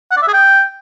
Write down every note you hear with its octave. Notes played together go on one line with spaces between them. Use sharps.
F#5
D5
E5
G#4
G5